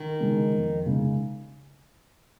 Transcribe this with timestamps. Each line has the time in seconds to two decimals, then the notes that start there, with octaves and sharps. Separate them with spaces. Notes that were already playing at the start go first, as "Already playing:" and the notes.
Already playing: D#3
0.21 C#3 G#3 D#4
0.53 F2
0.86 C#3 G#3 D#4